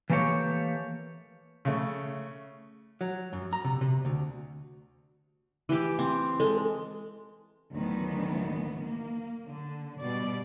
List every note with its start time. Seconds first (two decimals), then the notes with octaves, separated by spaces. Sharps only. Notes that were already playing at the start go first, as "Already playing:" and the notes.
0.10 E3 A3 A#3 G4 C#5
1.65 C#3 A3
3.01 F#3
3.33 F#2
3.53 A#5
3.64 C3
3.81 C3
4.05 D2
5.69 E3 G4
5.99 C4
6.40 G#3 A4
7.72 D2 A2 D#3 E3 F#3 B3
8.81 A#3
9.47 D3
10.00 B2 G3 D5